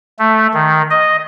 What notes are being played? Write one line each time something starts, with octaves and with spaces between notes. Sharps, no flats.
A3
D#3
D#5